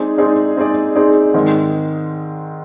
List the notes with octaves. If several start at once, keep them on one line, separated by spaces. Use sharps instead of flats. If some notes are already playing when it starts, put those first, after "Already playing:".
Already playing: G#3 C4 D#4 G#4 D5
G#3 C4 D#4 G#4 D5
G#3 C4 D#4 G#4 D5
G#3 C4 D#4 G#4 D5
G#2 D#3 G#3 C4